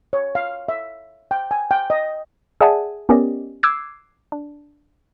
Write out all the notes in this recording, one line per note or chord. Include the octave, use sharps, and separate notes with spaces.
C#5
F5
E5
G5
G#5
G5
D#5
G#4 D5 E5 F#5 G#5 A5
B3 C#4 G4 A#4 D5 D#5
D6 E6 F#6 G#6 C7
D4